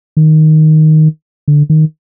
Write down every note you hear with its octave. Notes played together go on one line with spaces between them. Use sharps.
D#3
D3
D#3